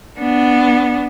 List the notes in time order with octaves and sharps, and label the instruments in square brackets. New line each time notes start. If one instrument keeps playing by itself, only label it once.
[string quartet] B3 D4